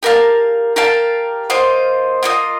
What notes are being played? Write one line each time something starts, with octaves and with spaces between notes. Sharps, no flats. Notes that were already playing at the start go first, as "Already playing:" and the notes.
G4 A#4 F5 A5
G4 A#4 F5 A5
A#3 F4 C5 D#5
A#3 F4 C5 D#5